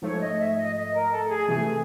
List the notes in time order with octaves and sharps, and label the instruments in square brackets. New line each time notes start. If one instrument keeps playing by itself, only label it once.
[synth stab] G#2 F3 A3 [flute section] C#5
[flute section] D#5
E5
D#5
D#5
A#4
A4
G#4
[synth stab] C3 E3 A3 [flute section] G#4